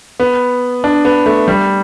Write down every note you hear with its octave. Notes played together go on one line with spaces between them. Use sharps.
B3
D4
B3
A3
G3